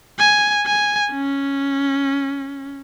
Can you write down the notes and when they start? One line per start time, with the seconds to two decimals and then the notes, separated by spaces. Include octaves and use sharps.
0.19 G#5
0.66 G#5
1.12 C#4